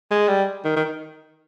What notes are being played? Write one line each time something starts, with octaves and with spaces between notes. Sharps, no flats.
G#3
G3
D#3
D#3